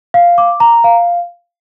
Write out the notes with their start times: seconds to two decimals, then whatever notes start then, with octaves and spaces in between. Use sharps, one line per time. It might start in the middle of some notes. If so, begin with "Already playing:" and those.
0.14 F5
0.38 D6
0.60 A#5
0.84 F5